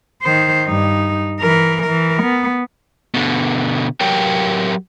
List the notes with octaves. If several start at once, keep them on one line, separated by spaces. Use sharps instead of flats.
D#3 C5
G2 D#4
E3 A#4
E3 A#4
B3
B2 D3
F#3 G4 A#4 C#5 G5